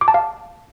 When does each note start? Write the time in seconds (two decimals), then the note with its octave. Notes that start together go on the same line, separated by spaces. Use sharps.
0.01 D6
0.08 A5
0.14 F5